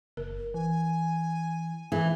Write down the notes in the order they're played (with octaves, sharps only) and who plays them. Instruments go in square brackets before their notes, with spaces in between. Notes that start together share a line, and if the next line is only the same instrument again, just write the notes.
[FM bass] F#1 [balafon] A#4
[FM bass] E3 [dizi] G#5
[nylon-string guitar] E3 [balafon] G#4